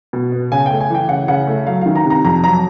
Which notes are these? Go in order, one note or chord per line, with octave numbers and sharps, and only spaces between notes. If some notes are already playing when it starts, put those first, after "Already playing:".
B2
B3
C#3 G#5
A3 G5
G#5
E3 G5
C#3 F#5
C#3 F#5
A3
F#3 F5
D#3 F5
A#5
C3
A#5
F2 A#5
F#3 A#5